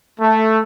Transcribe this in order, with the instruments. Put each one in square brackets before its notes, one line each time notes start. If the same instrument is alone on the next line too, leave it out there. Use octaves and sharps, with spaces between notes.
[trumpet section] A3